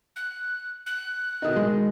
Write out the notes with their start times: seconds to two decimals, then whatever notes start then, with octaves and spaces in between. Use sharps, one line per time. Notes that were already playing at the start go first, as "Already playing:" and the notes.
0.16 F#6
0.86 F#6
1.42 B2 D#3 D#4
1.56 G#3